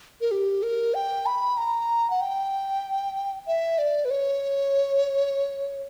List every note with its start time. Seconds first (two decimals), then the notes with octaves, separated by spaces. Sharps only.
0.21 A#4
0.31 G4
0.63 A#4
0.94 G5
1.26 B5
1.57 A#5
2.10 F#5
2.21 G5
3.47 E5
3.78 D5
4.05 B4
4.11 C#5